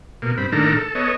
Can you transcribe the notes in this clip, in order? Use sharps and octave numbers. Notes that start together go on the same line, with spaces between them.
B2 A#3
G2 C4 B5
A2 D#3 A#3 D4 A4 A#5
A4
B3 A4 C#5 D#5